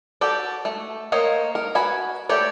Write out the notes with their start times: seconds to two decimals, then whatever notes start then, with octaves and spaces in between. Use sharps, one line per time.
0.21 F#4 G4 A4 D5
0.65 A3
1.12 A#3 C5 C#5 D#5
1.55 A#4
1.75 F#4 B4 G#5 B5
2.29 A3 G4 A4 C#5 D5